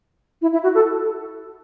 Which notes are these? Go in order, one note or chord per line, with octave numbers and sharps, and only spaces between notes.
E4
E4
F#4
A4